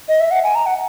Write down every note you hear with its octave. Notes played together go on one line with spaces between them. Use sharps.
D#5
E5
F#5
G#5
A#5
F#5